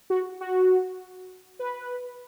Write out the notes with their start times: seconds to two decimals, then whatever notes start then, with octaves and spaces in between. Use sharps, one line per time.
0.10 F#4
0.41 F#4
1.59 B4